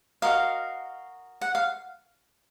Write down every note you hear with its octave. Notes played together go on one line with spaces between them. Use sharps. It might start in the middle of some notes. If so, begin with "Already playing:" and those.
F#4 A#4 D#5 F5
F#5
F5